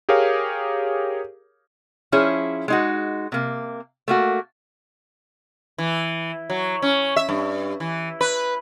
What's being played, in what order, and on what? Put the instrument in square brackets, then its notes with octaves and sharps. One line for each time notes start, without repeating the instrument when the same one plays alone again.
[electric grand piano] G4 G#4 A#4 C#5 F5
[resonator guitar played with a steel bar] F3 C#4 E4 G#4
G#3 D#4 F#4
C3 A#3
A3 A#3 F#4
[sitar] E3
F#3
C#4
E5
G2
E3
B4